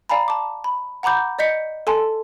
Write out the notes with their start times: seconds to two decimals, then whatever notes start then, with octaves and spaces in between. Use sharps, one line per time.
0.09 D5 F5 G#5 A#5 B5
0.28 A5 D6
0.64 B5
1.03 F#5 A#5 B5 D6 G6
1.39 D5 D#5 G6 B6 C#7
1.87 A4 G#5 A5 C6